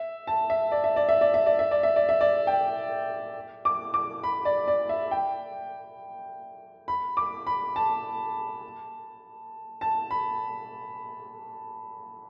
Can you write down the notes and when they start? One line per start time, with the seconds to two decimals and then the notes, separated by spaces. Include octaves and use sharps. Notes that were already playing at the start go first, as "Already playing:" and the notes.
Already playing: E5
0.27 A5
0.50 E5
0.72 D5
0.84 E5
0.96 D5
1.09 E5
1.21 D5
1.34 E5
1.46 D5
1.59 E5
1.71 D5
1.83 E5
1.96 D5
2.09 E5
2.21 D5
2.47 G5
3.65 D6
3.94 D6
4.24 B5
4.45 D5
4.68 D5
4.89 E5
5.11 G5
6.88 B5
7.17 D6
7.47 B5
7.76 A5
9.81 A5
10.11 B5